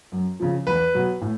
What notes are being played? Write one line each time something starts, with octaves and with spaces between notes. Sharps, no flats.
F#2
C#3 F3
E2 B4
B2 F#3
A2